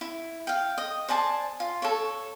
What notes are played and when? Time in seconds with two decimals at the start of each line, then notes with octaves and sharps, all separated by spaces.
0.01 E4
0.47 F5 G5
0.78 D#5
1.08 C5 D5 G#5 A5
1.60 F4
1.82 A4 C#5